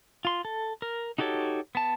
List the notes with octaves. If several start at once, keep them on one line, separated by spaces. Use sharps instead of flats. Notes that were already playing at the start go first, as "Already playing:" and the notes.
F4 C6
A4
A#4
D#4 F#4 G4 A4 C#5
B3 A5